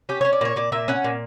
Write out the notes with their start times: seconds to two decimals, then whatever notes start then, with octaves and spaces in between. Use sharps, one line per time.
0.09 C#4 G4
0.21 C#4 C#5
0.33 D5
0.41 A#2 C#5
0.56 A#2 D5
0.72 A#2 E5
0.88 C#4 F#5
1.04 A#2